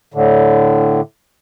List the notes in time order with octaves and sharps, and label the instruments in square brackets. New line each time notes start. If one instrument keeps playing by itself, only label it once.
[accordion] A2 D3